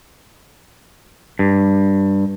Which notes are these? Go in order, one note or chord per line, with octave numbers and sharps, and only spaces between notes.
G2